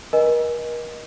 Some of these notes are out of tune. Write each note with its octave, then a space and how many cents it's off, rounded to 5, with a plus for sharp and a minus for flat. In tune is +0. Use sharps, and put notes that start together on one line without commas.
A#4 +40 D#5 +0 G#5 +0